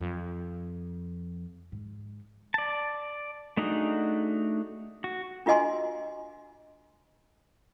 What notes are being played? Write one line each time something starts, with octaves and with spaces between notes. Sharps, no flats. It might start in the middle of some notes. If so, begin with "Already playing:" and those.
F2
G#2
D5 A5
A3 D4 D#4 F#4 G#4
F#4
D4 F4 F#4 D#5 G#5 C6